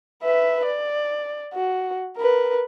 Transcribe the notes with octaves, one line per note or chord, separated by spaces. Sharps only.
B4 E5
D5
F#4
A#4 B4